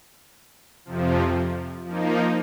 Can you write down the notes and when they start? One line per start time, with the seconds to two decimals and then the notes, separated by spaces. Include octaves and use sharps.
0.85 F2 C3 F3
1.85 F3 A#3 D#4